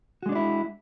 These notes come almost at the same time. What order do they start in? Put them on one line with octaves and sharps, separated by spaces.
F#4 G#3 D4 D5 E4